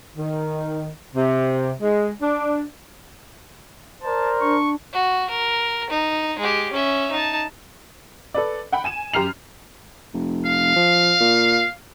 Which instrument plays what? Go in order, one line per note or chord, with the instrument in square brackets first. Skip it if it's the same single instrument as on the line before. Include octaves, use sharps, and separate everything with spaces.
[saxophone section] D#3
C3
G#3
D4
[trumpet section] A#4 C5 D5 [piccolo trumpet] A5
[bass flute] D4 [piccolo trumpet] C#6
[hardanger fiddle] F#4
A#4
D#4
G#3 G4
C#4 E5
D#4 A5
[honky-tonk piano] A4 B4 D5
F#5 G5 B5
G#5 D#7 E7
F#2 G4 A#5 F6 C7 F7
[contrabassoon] F1
[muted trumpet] F5
[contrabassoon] F3
A#2